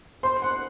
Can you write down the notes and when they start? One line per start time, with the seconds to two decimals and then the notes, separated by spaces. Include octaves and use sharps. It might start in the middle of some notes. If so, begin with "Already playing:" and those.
0.23 C5 C6
0.42 F#5 C6